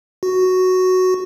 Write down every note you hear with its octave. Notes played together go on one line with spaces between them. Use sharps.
F#4